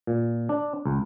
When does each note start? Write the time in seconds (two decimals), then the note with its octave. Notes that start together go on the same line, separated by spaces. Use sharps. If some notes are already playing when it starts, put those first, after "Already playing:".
0.07 A#2
0.49 D4
0.85 C#2